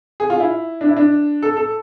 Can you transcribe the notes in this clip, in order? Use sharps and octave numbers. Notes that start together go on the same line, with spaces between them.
G#4
F4
E4
D4
E4
D4
A4
A4